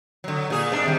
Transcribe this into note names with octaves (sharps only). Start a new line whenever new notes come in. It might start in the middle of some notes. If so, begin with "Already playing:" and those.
D3 F#3
A#2 G#4
G#2 D4
C3 D#3 G3